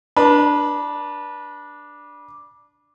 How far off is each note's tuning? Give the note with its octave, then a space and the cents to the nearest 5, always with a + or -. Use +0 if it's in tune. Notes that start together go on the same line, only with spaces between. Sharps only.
D4 +0 B4 -30